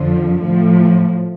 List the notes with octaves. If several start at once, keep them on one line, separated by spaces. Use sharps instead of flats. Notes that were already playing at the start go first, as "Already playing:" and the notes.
Already playing: F2 D3 F3
A2 F3